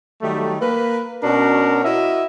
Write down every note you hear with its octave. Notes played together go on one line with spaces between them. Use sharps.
D#3 F#3 G3 A3
A#3 A#4 B4
B2 C#4 D4 F#4 A#4
E4 F#4 A#4 D#5 E5